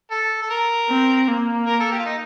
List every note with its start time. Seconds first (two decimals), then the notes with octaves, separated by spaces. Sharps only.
0.11 A4
0.42 A4
0.50 A#4
0.90 C4
1.28 A#3
1.66 A#4
1.80 A4
1.92 G4
1.99 F4
2.06 D#4